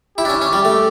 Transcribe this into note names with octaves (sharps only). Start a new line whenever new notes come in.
E4 G4
D4
C#4
C#4
G3
A3